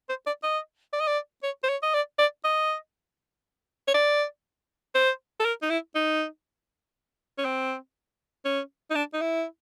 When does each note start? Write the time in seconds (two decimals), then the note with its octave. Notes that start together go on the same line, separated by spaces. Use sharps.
0.09 C5
0.27 D5
0.43 D#5
0.93 D5
1.00 D#5
1.07 D5
1.43 C#5
1.63 C5
1.69 C#5
1.83 D#5
1.94 D5
2.19 D5
2.44 D#5
3.88 C#5
3.94 D5
4.95 C5
5.40 A4
5.45 A#4
5.62 D#4
5.70 E4
5.95 D#4
7.38 C#4
7.45 C4
8.45 C#4
8.90 D#4
8.95 D4
9.14 D#4
9.21 E4